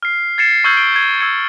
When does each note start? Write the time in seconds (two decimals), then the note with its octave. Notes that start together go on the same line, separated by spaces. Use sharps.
0.03 F6 C7
0.38 G#6 A6 C7 C#7 E7
0.64 C#6 E6 F6 G6 G#6 F#7
0.77 D7 G7
0.96 G#6
1.21 E6 G#6 C#7